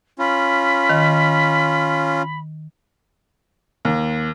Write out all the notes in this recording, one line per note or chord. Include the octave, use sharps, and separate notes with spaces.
C#4 F4 B5
D#3
D#2